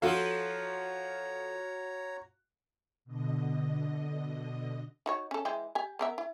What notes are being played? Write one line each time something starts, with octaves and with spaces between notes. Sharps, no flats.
F3 F#4 A4 C#5 F5 A#5
B2 D3 D#5
D#4 F#4 C#5
C#4 A4
E3 G#3 G5
G4 G#5
B3 A#4 E5
E4